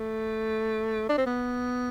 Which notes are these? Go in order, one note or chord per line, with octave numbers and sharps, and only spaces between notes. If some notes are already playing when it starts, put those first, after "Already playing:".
Already playing: A3
D4
C4
B3